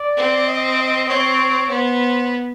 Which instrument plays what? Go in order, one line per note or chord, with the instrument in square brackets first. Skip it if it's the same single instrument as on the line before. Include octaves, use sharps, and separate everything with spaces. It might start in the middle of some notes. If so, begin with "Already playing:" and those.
Already playing: [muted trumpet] D5
[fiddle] C4
[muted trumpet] D#5
D#5
[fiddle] C4 [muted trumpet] C#5
[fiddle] B3 [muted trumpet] C5